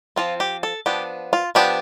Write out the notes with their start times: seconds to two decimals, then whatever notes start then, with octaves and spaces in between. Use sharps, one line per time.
0.16 F3 C4 F4
0.40 G4
0.63 A4
0.86 F3 B3 D4 G4
1.33 F4
1.55 F3 B3 D4 G4